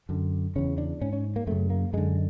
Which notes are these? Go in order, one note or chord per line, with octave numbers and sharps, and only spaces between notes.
F#2 D3
E2 C#3 C#4
D4
G#2 C#4
C#4
A#3
F#2 C#3 A3
A#3
F#2 D3 G#3